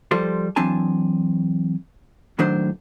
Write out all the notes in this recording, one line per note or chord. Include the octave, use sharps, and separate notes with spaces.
F3 G3 F4 A4 C5
E3 F#3 C4 D4 G#5 A5
C#2 A2 D#3 F#3 D4 C5